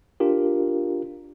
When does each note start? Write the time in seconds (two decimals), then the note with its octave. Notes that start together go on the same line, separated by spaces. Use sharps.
0.20 D4 F4 G4 A#4